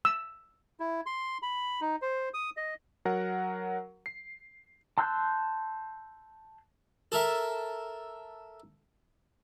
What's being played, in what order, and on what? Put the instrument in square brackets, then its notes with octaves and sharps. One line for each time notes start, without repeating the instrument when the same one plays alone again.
[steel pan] E6
[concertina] E4
C6
B5
D#4
C5
D#6
D#5
[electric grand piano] F#3 A#4 F#5
C7
[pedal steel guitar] A5 C6 E6 F#6 G6
[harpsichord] A4 A#4 E5